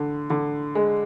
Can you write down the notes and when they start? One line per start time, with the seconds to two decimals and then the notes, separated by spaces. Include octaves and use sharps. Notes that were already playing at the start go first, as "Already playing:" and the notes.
Already playing: D3
0.30 D3
0.75 G#3